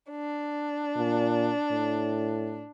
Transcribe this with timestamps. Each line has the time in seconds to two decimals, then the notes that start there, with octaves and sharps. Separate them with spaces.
0.10 D4
0.96 A#2
1.71 A2